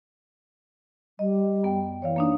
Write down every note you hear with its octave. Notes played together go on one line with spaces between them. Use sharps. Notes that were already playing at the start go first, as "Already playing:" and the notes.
G3 D#5
F#2 B3 G5
E3 C#5 D5 F5
A#3 D4 D#4